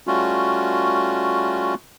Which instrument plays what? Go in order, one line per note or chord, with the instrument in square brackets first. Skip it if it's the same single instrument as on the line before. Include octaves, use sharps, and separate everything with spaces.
[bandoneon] G3 A3 C#4 F4 F#4